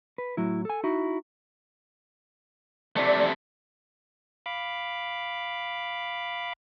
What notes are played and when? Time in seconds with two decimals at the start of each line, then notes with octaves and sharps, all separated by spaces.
0.18 B4
0.37 A2 F#3 E4
0.65 A4 G#5
0.84 D#4 E4 F#4
2.96 C3 A3 D5
4.46 F5 B5 D6